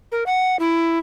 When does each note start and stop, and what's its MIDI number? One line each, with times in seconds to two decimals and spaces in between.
0.12 0.24 70
0.26 0.59 78
0.59 0.99 64